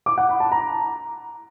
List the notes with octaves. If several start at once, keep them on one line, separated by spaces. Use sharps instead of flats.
D6
F#5
B5
A5
A#5